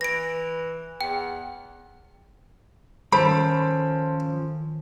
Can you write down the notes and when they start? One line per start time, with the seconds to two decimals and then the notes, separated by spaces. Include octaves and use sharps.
0.01 E3 A#6 D7
1.01 E2 G5
3.13 D#3 F3 C#4 A4 C5 A5 B5